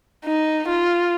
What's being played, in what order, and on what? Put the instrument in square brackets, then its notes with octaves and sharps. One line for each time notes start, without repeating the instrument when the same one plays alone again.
[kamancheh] D#4
F4